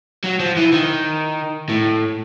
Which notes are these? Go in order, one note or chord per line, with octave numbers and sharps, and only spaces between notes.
F#3
F3
E3
D#3
A2